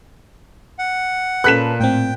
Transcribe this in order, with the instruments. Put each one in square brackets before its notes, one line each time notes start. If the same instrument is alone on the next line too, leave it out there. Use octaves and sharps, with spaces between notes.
[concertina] F#5
[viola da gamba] A#2 [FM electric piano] C#4 A4 B4 [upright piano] F#6 B6 E7
[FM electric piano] A2 C4 [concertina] G5